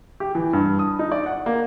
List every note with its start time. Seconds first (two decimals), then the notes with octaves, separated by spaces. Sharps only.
0.20 G4
0.35 E3
0.53 G2
0.79 D#6
0.99 D#4
1.12 D5
1.26 F#5
1.46 A#3